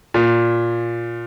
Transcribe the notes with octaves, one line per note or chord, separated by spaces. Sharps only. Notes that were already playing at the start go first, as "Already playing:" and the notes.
A#2